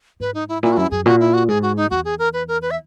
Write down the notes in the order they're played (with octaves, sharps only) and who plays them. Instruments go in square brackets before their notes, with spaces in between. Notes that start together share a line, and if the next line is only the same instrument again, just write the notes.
[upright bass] G#2 [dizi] B4
[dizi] D#4
E4
[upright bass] A#2 [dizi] E4
[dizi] F#4
[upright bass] F#2 [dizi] E4
[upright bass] F#2 [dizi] G#4
[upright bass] A#2 [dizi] F#4
[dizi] E4
F#4
[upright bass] G#2 [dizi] G#4
[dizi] F#4
D#4
[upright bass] E2 [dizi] F#4
[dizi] G#4
A#4
B4
A#4
B4
E5